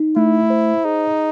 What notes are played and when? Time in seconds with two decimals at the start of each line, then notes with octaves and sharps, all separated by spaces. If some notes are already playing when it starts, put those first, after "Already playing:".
Already playing: D#4
0.16 A3 E4
0.50 C5
0.85 D#4 G#4